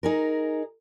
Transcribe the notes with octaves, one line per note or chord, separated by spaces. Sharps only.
D#4 G#4 A#4